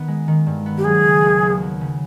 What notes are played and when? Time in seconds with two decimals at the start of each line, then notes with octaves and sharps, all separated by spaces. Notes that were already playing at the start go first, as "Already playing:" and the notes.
Already playing: D#3 B3
0.08 G#3
0.28 D#3
0.46 G2
0.66 B3
0.78 G4
0.84 F#3 G#4
1.04 C#3
1.23 D#2
1.42 D#2
1.62 F#3
1.81 C#3